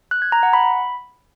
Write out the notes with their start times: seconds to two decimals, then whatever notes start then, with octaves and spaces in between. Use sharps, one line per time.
0.11 F#6
0.22 G#6
0.32 A#5
0.43 F#5
0.53 B5